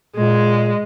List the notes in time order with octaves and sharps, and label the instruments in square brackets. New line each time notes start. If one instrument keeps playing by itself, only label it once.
[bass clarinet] A#2 [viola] G#3